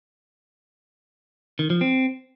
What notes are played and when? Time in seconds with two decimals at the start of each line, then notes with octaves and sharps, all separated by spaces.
1.59 D#3
1.70 F3
1.81 C4